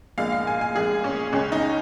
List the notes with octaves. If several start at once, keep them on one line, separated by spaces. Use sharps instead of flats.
A#1 A#2 G#3 F5
F5
G#5
G#5
A#1 A#2 G#3 G#4
C#4
C#2 C#3 G#3 C#4
D#4